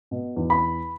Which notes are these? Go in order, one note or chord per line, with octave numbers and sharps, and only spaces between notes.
B2
E2
B5